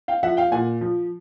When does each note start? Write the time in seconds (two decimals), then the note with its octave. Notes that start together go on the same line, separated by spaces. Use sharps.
0.08 F5 G5
0.23 F3 E5 F#5
0.37 F5 G5
0.52 A#2 F#5 G#5
0.81 F3